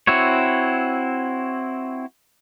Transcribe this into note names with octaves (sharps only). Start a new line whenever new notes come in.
C4 E4 F#4 C#5